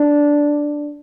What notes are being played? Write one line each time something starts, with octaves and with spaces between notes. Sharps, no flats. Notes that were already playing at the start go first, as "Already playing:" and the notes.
Already playing: D4